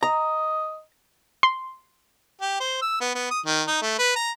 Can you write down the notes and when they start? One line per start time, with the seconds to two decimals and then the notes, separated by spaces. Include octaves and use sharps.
0.03 D#5 A#5
1.43 C6
2.41 G4
2.60 C5
2.82 E6
3.01 B3
3.15 B3
3.31 D#6
3.46 D#3
3.67 D#4
3.82 A3
3.99 B4
4.16 A#5